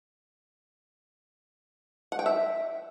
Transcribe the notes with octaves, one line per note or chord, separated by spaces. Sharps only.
F#5
G5
E5